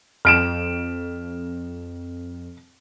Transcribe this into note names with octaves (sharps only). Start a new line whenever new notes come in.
F2 F6 D7 E7